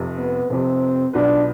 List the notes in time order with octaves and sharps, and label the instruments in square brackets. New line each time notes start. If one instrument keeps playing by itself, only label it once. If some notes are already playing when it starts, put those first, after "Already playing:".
Already playing: [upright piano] F1 F2 C3
[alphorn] B3
[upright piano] F1 F2 C3 [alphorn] C4
[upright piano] B1 B2 B3 F4 B4 [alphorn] D4